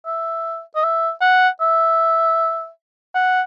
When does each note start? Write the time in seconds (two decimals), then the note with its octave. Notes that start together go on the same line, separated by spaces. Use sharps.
0.06 E5
0.75 D#5
0.84 E5
1.21 F#5
1.61 E5
3.14 F#5